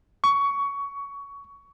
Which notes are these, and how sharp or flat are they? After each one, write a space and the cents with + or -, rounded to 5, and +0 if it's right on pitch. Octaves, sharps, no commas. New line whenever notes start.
C#6 +20